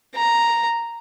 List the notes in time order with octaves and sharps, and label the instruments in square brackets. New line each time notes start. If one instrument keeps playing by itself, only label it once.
[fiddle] A#5